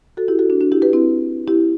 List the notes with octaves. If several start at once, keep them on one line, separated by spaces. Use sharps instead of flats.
F#4 A4
E4 G4
F#4 A4
D4 F#4
D4 F#4
E4 G4
G4 B4
C4 E4
E4 G4